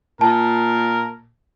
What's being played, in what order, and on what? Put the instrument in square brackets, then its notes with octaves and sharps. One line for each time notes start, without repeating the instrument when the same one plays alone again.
[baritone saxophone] A#2 [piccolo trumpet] A#4 [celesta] A5